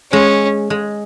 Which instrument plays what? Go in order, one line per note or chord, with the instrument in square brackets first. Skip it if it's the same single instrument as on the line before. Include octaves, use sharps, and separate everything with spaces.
[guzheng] G#3 [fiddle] C#4
[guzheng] G#3